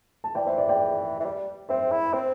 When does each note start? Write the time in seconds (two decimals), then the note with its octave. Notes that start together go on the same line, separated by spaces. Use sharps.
0.24 A5
0.35 E3 D5 G5
0.46 C5 E5
0.57 D5
0.69 D5 G5
1.20 E3
1.25 G3
1.69 C4 C5 E5
1.92 E4
2.13 C4 C5